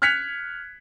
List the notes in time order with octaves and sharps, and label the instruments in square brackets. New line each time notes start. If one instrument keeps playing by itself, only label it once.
[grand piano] F6 F#6 G#6 B6 C#7 F7